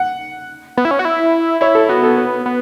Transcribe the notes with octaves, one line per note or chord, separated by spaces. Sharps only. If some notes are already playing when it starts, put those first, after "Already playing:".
Already playing: F#5
B3
E4
C#4
F#4
E4
E4 C#5
A4
B3 F#4
A4
B4
B3